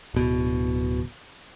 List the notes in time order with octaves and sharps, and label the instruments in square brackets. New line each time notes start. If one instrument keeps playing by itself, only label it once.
[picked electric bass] D1 B2